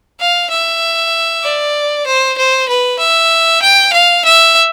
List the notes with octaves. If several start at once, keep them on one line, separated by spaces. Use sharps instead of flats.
F5
E5
D5
C5
C5
B4
E5
G5
F5
E5